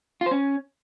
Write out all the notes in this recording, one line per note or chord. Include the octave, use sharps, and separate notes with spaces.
F4
C5
C#4